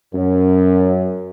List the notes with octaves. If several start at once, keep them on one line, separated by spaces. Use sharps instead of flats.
F#2